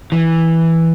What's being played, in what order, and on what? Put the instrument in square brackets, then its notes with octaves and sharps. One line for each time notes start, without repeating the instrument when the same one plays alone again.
[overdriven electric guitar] E3